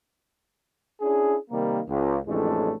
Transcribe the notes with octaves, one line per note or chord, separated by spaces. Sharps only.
C#4 D4 E4 G#4
C3 D#3 G3 A#3
C#2
A1 F2 A2 G#3 A3 D4